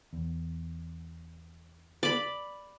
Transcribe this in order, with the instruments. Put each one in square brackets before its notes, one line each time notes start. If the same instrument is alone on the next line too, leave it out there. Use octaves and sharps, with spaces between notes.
[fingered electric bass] E2
[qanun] D5 B5